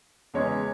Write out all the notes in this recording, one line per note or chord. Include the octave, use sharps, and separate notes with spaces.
E2 C#3 G#3 C#4 C#5